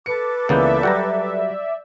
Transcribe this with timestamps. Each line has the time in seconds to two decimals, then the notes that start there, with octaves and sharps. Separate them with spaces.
0.06 A4 B4 D6 C#7
0.49 C#2 C#3 E3 A#3 B3 D5 E5 G6
0.83 F#3 G3 F#4 F#5 G5 A#5